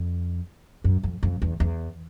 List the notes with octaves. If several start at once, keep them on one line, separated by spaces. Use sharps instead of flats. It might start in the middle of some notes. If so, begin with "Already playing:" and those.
Already playing: F2
F#2
F2
F2
E2
E2